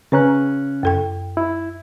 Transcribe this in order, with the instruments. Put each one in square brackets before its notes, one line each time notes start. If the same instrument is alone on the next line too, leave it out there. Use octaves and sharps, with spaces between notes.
[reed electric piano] C#3 C#4 F#6 [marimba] B4 A#5
[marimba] F#2 A4 G5
[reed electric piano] E4